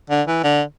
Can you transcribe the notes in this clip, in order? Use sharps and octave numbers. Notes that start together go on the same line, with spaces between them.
D3
E3
D3